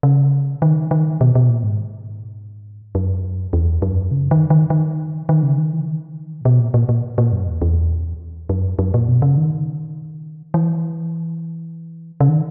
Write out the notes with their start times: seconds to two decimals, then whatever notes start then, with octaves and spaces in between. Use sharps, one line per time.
0.03 C#3
0.62 D#3
0.91 D#3
1.21 B2
1.35 B2
1.49 A#2
1.63 G#2
2.95 F#2
3.53 E2
3.82 F#2
4.11 C#3
4.31 D#3
4.50 D#3
4.70 D#3
5.29 D#3
5.43 C#3
5.58 D#3
5.73 E3
5.88 D#3
6.41 A#2
6.45 B2
6.60 A#2
6.74 A#2
6.89 A#2
7.18 A#2
7.32 F#2
7.47 E2
7.62 E2
8.49 F#2
8.79 F#2
8.94 A#2
9.08 B2
9.22 C#3
9.37 D#3
10.54 E3
12.20 C#3
12.29 D#3